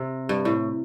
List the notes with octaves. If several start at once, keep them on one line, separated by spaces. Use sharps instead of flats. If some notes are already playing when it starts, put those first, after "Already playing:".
Already playing: C3
G2
A2